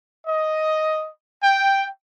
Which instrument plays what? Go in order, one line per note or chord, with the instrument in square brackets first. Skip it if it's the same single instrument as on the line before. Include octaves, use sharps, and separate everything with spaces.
[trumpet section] D#5
G5